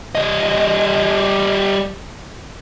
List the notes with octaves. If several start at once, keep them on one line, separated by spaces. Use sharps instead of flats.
G3 D#5